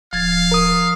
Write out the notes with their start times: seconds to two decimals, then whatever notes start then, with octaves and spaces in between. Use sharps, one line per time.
0.13 D1 F3 F5 G#6 A6
0.52 A#4 D#6